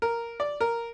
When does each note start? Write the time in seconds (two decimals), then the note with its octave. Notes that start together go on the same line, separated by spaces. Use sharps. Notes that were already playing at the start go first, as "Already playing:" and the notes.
0.02 A#4
0.40 D5
0.60 A#4